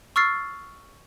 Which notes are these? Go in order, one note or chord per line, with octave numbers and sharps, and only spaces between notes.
C#6 E6 F6 A6 C7